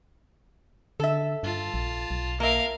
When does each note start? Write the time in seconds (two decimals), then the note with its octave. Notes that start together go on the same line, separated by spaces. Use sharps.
1.00 D3 A4 E5
1.43 G2 F4 A5
1.74 A#1
2.11 B1
2.40 A#3 A#4 E5 F5